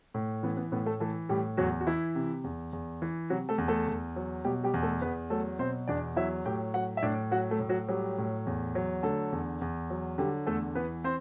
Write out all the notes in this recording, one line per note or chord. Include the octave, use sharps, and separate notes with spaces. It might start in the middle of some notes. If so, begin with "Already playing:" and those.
A2
E3 B3
B3
A2 B3
A3 A4
E3 A3 A4
A2 G3 G4
E2 F#3 F#4
F#4
E3 E4
C3
E2
E2
E3
C3 F#3 F#4
A3 A4
E2
A3 A4
E2
F#3
B2 G3 G4
G3 G4
E2
A3 A4
E2 B3 B4
F#3 A3 A4
B2 C4 C5
E2 D4 D5
F#3 E4 E5
A2 G4 G5
F#3 F#4 F#5
E5
A2 D4 D5
F#3 F#4 F#5
A3 A4
A2
F#3 F#4
F#3 G3 G4
A2
E2
F#3
D3 A3 A4
E2
E2
F#3
D3 G3 G4
E2 A3 A4
E3 B3 B4
C4 C5